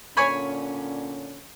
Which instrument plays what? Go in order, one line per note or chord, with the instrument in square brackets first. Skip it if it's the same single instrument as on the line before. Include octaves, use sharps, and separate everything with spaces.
[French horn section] A#2 D3 C#4 [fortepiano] C#5 G#5 B5